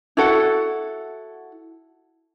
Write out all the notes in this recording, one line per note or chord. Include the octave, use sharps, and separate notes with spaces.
E4 F#4 A4 F#5